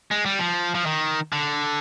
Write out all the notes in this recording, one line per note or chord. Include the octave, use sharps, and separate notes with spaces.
G#3
G3
F3
F3
D#3
D3